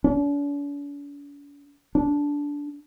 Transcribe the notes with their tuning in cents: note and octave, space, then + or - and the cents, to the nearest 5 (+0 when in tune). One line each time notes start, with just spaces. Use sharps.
D4 -45
D4 -15